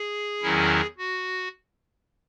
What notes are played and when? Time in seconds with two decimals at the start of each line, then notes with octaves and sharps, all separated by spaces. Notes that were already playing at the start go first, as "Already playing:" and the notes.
Already playing: G#4
0.42 E2 D#3 F#3 C#4 E4
0.98 F#4